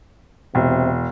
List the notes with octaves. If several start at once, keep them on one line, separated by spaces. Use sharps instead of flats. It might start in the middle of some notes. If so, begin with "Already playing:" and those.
E1 C3